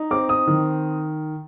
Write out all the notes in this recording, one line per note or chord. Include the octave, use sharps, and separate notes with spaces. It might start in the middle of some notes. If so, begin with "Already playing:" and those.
Already playing: D#4
C4 D6
D#6
D#3